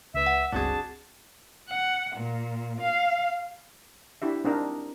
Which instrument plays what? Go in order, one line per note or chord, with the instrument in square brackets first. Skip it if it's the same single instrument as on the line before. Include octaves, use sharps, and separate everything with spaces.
[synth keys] C#2 B4 [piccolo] E5
[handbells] F#5
[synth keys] G1 C#2 C4 [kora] D4 F#4 G#4 [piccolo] A5
[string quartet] F#5
A#2
F5
[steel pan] D4 E4 G4 E5
C4 D4 D#4 A#4